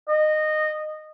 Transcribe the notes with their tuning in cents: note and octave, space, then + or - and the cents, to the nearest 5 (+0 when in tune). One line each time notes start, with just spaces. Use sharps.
D#5 -15